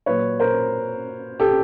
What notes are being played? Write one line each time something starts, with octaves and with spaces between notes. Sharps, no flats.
A#2 F#3 B4 C#5
A#4 C5
G4 A4